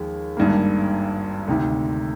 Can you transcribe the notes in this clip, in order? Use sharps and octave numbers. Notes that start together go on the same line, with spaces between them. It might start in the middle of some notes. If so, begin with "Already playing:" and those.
Already playing: D#2 F3 G#3
G#1 G2 D#3 A#3
D2 C3 D#3